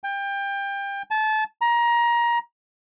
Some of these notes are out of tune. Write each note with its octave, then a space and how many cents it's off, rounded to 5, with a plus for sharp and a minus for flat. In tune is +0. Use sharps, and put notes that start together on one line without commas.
G5 +25
A5 -25
A#5 +25